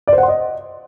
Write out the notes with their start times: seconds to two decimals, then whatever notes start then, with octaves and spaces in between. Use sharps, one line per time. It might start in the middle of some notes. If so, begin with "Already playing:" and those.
0.07 D5
0.13 C5
0.18 F#5
0.23 C6
0.28 D#5